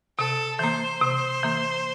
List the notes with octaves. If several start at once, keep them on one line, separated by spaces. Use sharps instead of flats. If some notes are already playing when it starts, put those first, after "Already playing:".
C3 A4
E3 A#3 C5
C3
E3 A#3